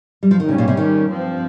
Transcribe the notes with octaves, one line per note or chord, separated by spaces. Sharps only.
G3
F3
D#3
G#2 C#3 G3 C#4
A#2
C3
D#3
G2 F3 C4